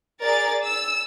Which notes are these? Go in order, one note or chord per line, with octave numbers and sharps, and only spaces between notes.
G#4 A#4 D5 A6
E6